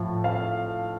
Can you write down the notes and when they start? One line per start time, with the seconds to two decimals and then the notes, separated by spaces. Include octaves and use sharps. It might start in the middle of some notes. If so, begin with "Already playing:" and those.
Already playing: A2 F3
0.24 F5